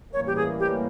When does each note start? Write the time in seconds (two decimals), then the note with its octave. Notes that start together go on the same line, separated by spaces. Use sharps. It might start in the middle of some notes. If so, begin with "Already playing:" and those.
0.13 A2 E3 G3 A#3 C#4 C#5
0.27 G4
0.36 G#4
0.60 G4